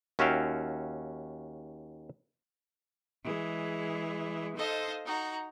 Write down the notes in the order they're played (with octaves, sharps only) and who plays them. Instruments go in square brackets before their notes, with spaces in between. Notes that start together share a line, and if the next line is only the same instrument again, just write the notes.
[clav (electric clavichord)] D#2 C#4 F#4 E5 F5 G5
[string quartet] E3 G#3 G#4
D#4 A4 C5 D#5 F5
D#4 F#4 A#5